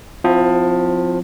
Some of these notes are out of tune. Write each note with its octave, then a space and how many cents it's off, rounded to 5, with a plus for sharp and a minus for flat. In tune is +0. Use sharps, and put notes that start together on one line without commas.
F3 +20 C4 -15 E4 +25